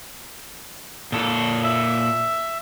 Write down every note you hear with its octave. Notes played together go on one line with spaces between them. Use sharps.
A#2 A4
E5